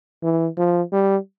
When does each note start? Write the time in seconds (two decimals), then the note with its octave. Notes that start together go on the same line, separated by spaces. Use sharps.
0.23 E3
0.58 F3
0.92 G3